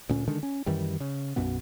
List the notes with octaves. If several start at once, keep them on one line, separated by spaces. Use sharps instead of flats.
D2 A#2 C#4
D3 D#3 G#3 D4
C#4
F#2 D#3 E3 G3
C#3
B1 F#2 B2 B3